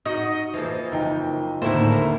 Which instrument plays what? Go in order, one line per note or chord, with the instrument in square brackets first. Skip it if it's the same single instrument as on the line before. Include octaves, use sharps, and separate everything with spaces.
[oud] D#4 F#4 [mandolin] D#5
[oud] E3 F3 A#3
[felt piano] F#1 D#4 G5
[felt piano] D2 D#3 A3 [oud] A2 [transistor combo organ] A#3 [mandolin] E4 C5
[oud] D#2 A#4